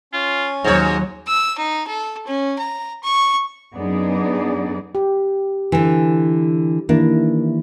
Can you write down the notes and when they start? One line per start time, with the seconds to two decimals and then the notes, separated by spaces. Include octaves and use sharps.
0.13 C#4 F4 G#5
0.64 D#2 G#2 F#3 C#5 A#5
1.27 E6
1.58 D#4
1.87 A4
2.27 C#4
2.59 A#5
3.03 C#6
3.75 F#2 B3 D4 D#4 G#4 D5
4.95 G4
5.72 D3 E3
6.89 D#3 E3 A#3 D4 E4